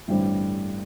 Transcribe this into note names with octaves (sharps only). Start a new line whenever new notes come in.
A1 G2 D3 G3 C4